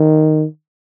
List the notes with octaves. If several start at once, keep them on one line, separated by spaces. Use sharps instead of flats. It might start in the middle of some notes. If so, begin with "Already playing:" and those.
Already playing: D#3